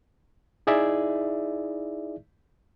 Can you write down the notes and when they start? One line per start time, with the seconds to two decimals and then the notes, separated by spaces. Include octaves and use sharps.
0.67 D#4 E4 G#4 D5 E5